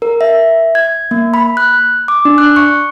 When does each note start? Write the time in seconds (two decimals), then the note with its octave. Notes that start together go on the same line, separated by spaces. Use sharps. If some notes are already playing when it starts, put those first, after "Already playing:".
0.02 A#4
0.21 E5
0.75 G#6
1.11 A#3
1.34 B5
1.57 F#6
2.08 D6
2.25 D4
2.38 F#6
2.56 C#6